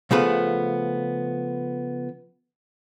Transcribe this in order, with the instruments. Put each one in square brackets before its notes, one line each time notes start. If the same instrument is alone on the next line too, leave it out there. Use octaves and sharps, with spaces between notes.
[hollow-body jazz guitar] C#3 F3 A3 B3 B4